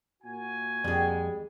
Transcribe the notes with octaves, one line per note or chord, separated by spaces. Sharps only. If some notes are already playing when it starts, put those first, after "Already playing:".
A#2 F#4 G#5
F2 G3 G#3